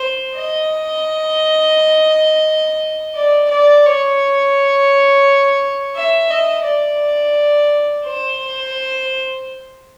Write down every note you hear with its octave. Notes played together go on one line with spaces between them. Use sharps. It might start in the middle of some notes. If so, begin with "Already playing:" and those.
Already playing: C5
D#5
D5
D5
C#5
E5
D#5
D5
C5